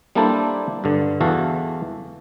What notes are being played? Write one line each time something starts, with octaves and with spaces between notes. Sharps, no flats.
G3 A#3 D4 E4 A4 C5
G2 D3
E2 E3 F#4 A4 F5